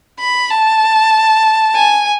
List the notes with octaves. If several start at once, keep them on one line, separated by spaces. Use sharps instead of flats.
B5
A5
G#5